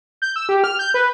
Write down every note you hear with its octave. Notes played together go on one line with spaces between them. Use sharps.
G6
E6
G4
F6
G6
B4